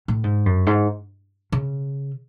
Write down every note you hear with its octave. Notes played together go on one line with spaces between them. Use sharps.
A2
G#2
F#2
G#2
C#3